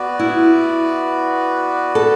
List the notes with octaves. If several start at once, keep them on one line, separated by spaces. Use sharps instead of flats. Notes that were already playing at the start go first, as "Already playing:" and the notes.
Already playing: B3 F#4 B4 D5
E4
A4